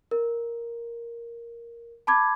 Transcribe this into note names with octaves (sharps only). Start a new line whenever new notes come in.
A#4
A5 B5 D6 G#6